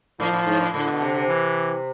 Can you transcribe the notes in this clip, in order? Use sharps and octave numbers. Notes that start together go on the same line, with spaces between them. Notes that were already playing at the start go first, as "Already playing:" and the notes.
A2 F3
A2
G#2
A2
A2 D3
B2
C3
C3
E3